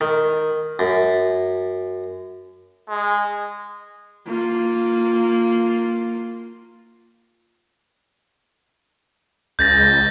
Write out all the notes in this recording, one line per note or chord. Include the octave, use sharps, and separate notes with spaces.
D#3
F#2
G#3
A#3 F4
C#2 G6 A6 A#6